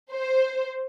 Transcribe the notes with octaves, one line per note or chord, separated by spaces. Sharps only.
C5